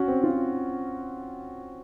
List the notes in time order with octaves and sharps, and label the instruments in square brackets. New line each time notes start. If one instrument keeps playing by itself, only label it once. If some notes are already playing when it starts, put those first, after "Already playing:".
Already playing: [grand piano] C#4 F#4
C4
F4